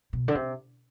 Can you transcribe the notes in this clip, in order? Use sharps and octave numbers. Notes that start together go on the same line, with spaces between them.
B2
D3
C3